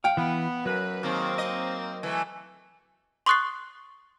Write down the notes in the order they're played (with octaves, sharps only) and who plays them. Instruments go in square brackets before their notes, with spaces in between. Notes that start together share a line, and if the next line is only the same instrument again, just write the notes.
[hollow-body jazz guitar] F5 G5
[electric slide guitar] E3 [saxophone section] B3
[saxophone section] F#2 B4 [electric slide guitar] F#3
[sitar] G#2 D#3 [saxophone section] A#3 C4
[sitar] D#5
E3 A3
[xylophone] C6 C#6 D#6 F#6 A6 C7